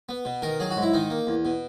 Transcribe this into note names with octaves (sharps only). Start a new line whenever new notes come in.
B3
B2
D#3 A#4
F#3 G#4
F#4
G#2
E4
D#3 D#4
A#3
E2
B2